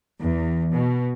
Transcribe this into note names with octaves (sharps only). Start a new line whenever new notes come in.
E2
B2